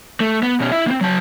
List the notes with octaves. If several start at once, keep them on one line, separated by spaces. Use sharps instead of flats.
A3
B3
B2 C#4
E4 E5
A#3 C4
F#3 A5